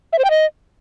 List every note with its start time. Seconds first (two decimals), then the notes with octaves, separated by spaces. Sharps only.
0.13 E5
0.19 C5
0.24 G5
0.30 D#5